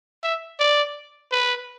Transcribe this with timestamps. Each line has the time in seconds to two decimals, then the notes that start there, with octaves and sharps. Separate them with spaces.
0.23 E5
0.60 D5
1.32 B4